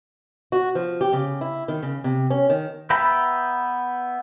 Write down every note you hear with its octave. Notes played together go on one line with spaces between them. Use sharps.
F#4
F3
G4
C#3
E4
D#3
C#3
C3
C#4
D#3
B3 B4 E5 G5 A#5